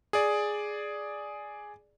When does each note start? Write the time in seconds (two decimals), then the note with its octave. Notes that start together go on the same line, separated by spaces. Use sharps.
0.13 G#4 D5